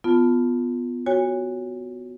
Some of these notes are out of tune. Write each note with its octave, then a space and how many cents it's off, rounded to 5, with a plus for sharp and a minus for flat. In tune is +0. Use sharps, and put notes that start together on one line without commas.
B3 +10 F4 +0 A5 +0
F#4 +0 C#5 +0 G#5 -30